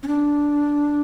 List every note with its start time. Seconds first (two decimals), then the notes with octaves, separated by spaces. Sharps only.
0.03 C#4
0.08 D4